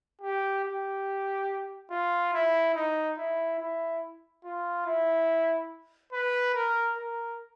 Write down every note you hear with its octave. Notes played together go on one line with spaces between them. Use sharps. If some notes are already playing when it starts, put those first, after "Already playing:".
G4
G4
F4
E4
D#4
E4
E4
F4
E4
B4
A#4
A#4